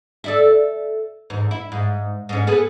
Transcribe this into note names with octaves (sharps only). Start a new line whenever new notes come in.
A4 D5 E5
E2 G#2
E4
G#2
G#2 C#4
B3 G#4 A4